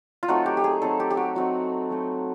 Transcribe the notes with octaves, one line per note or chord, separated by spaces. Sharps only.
F4
F#3 A3 C4 D#4 F#4
G4
G4
G#4
F#3 A3 C4 D#4 A4
G4
G4
F#4
F#3 A3 C4 D#4 F#4
F#3 A3 C4 D#4